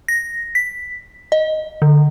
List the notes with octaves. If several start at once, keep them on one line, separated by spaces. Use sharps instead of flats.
A#6
B6
D#5
D3